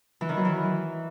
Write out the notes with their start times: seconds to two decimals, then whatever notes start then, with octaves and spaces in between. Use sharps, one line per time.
0.21 E3
0.29 D#3
0.37 F#3
0.45 E3